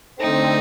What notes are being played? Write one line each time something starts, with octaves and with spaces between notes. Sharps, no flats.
D3 A3 C4 D#4